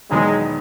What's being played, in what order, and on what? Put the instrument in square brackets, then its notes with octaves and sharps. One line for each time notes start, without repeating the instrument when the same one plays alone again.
[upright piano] E1 E2 D#3 F#3 B3 [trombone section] G#3